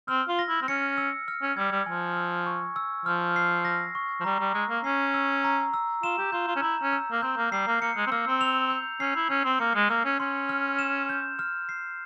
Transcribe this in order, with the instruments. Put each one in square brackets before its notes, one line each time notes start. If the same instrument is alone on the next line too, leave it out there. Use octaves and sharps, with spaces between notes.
[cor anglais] C4 [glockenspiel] F6
[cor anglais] F4
[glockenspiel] A#6
[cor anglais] E4
C4
[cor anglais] C#4 [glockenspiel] C#7
[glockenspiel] E6
F6
[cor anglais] C#4
[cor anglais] G3 [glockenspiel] G#6
[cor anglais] G3
[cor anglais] F3 [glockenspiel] G#5
[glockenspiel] E6
C#6
E6
[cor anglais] F3 [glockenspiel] F6
[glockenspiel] C7
A#6
C#6
[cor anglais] F3
[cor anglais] G3 [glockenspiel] A#5
[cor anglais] G3
[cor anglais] G#3 [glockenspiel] E6
[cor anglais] A#3
[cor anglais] C#4 [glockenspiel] C7
[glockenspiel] E6
A#5
E6
[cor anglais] F4 [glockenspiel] E7
[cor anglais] G4
[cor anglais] F4 [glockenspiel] G6
[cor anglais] F4
C#4
[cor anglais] E4 [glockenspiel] A#5
[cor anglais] C#4
[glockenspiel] E6
[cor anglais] A#3
[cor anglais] C4 [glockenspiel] G6
[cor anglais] A#3
[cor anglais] G3 [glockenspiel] C7
[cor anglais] A#3
[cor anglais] A#3 [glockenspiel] C#7
[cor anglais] G#3
C4
[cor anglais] A#3 [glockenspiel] E6
[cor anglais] C4
[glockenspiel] F7
G6
[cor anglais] C#4 [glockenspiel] C7
[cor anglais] E4
[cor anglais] C#4 [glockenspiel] E6
[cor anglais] C4
[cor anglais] A#3 [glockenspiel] C#7
[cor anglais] G#3
[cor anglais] A#3 [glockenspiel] E6
[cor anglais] C#4
[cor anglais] C#4 [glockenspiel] C6
[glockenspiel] F6
E7
G6
F6
C7